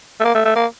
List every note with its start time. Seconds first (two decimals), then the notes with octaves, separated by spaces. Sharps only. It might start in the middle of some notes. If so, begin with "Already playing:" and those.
0.20 A3
0.25 A#3
0.35 A3
0.45 A3
0.55 A#3